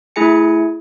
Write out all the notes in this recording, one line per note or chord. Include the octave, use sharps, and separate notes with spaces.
A3 E4 G#4 G#5 C#7